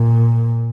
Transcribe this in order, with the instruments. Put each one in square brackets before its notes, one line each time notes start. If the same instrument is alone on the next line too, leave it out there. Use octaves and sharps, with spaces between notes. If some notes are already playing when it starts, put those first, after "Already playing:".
Already playing: [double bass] A#2